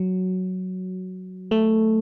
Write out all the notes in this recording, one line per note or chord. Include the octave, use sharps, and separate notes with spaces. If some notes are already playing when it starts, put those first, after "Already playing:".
Already playing: F#3
A3